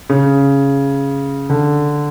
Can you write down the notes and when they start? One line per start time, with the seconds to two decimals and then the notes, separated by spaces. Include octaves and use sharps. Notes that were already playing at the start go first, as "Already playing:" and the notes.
0.09 C#3
1.49 D3